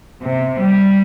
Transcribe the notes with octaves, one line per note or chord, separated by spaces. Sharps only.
C3
G3